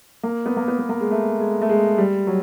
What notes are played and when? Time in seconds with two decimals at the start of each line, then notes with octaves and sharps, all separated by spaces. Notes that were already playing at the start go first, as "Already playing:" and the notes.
0.23 A#3
0.46 B3
0.57 A#3
0.68 B3
0.79 B3
0.89 A#3
1.01 G#3
1.11 A3
1.40 G#3
1.62 A3
1.69 G#3
1.98 G3
2.27 F#3